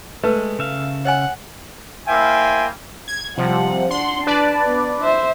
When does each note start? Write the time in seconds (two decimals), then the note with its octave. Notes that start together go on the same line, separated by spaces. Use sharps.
0.24 G#3 A3 B4
0.59 C#3 E5 F5
1.05 C#5 D#5 F#5 G#5
2.07 A#3 E4 C5 E5 G5 G#5
3.08 G#6
3.38 C3 F3 G3 F#5
3.91 D4 F#5 C6
4.27 D4 B4 D5 A5
4.65 B3
5.02 C5 E5